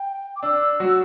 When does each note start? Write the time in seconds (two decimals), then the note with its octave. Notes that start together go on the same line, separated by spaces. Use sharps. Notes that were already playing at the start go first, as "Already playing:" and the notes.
Already playing: G5
0.36 D6
0.43 D4 E6
0.80 F#3 F#4